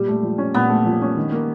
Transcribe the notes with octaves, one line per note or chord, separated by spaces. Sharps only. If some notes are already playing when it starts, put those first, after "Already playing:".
Already playing: A#2 G3 G4
A3
F3
C#4
A#2 B3
A3
F3
C#4
D#3
A#3